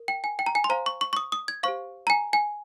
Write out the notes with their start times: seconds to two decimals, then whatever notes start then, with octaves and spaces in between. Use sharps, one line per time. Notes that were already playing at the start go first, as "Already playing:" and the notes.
Already playing: A#4
0.08 G5
0.24 G#5
0.39 G5
0.46 A#5
0.55 G#5
0.64 C6
0.70 C5 F5 A#5
0.86 C#6
1.01 C#6
1.13 C#6
1.17 D#6
1.32 D#6
1.48 G#6
1.63 G4 C5 F5 C#6
2.07 A#5
2.10 G#5
2.33 G#5